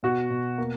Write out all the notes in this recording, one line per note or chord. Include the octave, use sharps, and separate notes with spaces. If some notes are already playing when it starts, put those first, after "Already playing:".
B2 F#4
B2
A#3